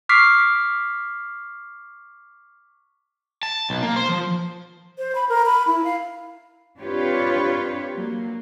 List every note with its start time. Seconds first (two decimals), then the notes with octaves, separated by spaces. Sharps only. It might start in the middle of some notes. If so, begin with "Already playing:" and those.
0.09 C#6 D6 F6 B6 C7
3.43 A5
3.70 B1
3.83 A#3
3.96 C5
4.09 F3
4.98 C5
5.15 B5
5.29 A#4
5.46 B5
5.67 E4
5.84 F5
6.80 C4 D4 F4 G4 B4 C#5
7.96 F#3 A#3